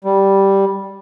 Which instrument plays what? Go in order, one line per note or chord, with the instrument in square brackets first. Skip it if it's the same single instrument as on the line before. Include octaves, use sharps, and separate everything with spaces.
[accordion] G3